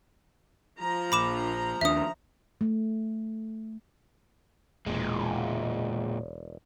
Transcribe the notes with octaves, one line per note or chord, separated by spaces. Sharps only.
F3 A#5
A#1 B5 D6 E7
D#2 D4 E5 D#6
A3
E1 A#2 G#3